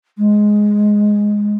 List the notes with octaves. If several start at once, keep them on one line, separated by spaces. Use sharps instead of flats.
G#3